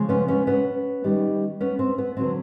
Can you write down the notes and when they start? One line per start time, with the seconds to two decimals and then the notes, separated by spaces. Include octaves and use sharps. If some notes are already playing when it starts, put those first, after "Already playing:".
Already playing: C#3 F3 G#3
0.09 B3 C#4
0.28 B3 C#4
0.47 B3 C#4
1.04 D#3 G3 B3
1.60 B3 C#4
1.79 C4
1.98 B3
2.16 D3 F#3 B3 C4